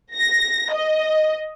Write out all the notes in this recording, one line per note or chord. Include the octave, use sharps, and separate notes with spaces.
A#6
D#5